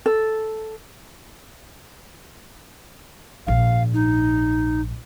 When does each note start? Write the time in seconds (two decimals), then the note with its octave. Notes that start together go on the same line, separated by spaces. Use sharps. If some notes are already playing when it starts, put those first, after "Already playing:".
0.06 A4
3.47 A#1 G#2 F5
3.94 D#4